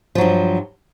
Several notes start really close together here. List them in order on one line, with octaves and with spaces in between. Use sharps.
F3 F#3 G2